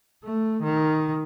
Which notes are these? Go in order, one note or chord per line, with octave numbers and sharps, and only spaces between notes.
A3
D#3